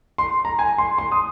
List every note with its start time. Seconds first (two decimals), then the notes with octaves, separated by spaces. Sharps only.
0.18 C6
0.45 A#5
0.59 G#5
0.78 C6
0.98 C6
1.12 D#6